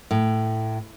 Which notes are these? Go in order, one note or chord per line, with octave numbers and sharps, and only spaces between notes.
A2